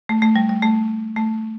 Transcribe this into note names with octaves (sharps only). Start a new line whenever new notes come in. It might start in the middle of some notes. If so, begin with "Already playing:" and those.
A3
A3
G3
G3
A3
A3